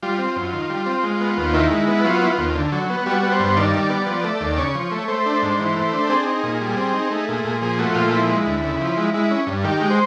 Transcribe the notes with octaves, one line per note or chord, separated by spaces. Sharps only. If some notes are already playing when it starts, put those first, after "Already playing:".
G3 F4
C4
F#2
D#3
G3
C4
G#3
B3
D#2
D#3 E4
G#3
B3
F#3 F4
B3 E4
F4
D#2
D3
F#3
B3
G3 F#4
B3
C5
G2
D#3 D5
G3
B3
F3
A3
D#2
C#3 C#5
F3
A3
A3 C5
D4
G#2
E3
A3
D4
C4 G#4
D#4
A#2
G3
C4
D#4
A3
A#2
A#2
F3 G#4
A3 F#4
A#2 F4
F3 E4
G#3
D2
C#3
F3
G#3
G#3 E4
C#4
G2
D#3 G4
G#3
C5